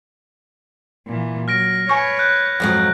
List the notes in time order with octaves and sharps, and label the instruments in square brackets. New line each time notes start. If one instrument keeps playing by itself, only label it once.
[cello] A#2 E3
[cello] F#3 [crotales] F6 A#6 D7
[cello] B4 C#5 [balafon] G#5 C#6
[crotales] F#6 G6
[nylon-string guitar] F2 G#2 F#3